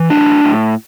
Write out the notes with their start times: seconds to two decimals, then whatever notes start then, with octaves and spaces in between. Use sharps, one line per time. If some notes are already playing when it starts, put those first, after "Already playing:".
Already playing: E3
0.10 A2 D4
0.44 A2